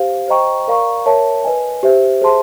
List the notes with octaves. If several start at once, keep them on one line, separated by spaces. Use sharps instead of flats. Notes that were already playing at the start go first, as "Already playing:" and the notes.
Already playing: G4 C5 F5
C5 D#5 G5 A#5 C#6
A#4 D5 F5 A#5 C#6
A#4 C#5 E5 A5
B4 D#5 G#5
G4 C5 E5
G#4 C5 E5 A5 C6